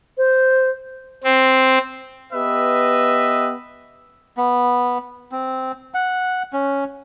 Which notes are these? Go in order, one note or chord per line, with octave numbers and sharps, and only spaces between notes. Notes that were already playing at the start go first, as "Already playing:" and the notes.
C5
C4
B3 G4 B4 D#5 E5
B3
C4
F#5
C#4